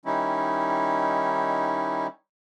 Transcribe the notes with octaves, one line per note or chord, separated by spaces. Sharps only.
D#3 G3 C#4 D#4 E4